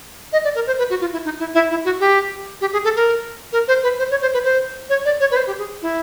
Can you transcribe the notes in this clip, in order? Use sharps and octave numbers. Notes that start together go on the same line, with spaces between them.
D#5
D5
A#4
C5
B4
F#4
F4
E4
D#4
E4
E4
E4
F#4
G4
G4
G#4
A4
A#4
A#4
C5
B4
C5
C#5
C5
B4
C5
C#5
D5
C#5
B4
C5
G4
G#4
E4